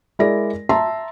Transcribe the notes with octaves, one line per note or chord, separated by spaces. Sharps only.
G#3 E4 G#4 A#4 D5 A#6
E5 A5 A#5 C6